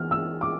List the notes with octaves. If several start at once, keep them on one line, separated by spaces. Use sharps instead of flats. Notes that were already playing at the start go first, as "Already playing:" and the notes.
Already playing: E3 B3 F6
E6
D6